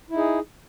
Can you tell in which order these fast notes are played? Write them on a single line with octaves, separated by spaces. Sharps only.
E4 D#4 G#4